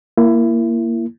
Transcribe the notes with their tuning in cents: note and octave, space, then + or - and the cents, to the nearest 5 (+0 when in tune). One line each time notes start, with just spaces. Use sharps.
A#3 +0 E4 +25